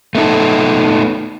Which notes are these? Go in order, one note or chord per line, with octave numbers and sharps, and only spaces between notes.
A3 B3 D#4 A4